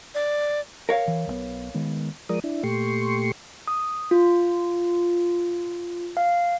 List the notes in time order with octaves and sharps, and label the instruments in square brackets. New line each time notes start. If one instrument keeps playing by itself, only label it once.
[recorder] D5
[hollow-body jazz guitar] A#4 C#5 F5
[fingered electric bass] E3
B1 E3 B3
D#3 G#3 B3
[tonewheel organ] F3 G#3 A#4 D5 D#6
D4 E4
A#2 A3 G4 C6 C#6
[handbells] D#6
F4
F5